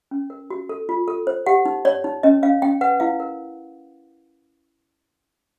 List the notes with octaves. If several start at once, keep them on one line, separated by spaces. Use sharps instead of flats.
C#4
A#4
F#4
A4
F4
A4
C5
G4 F#5
D#4
C#5 D5
D#4
C#4 D#5
C#4 F5
C#4 G5
B4 F#5
E4 F5
A#4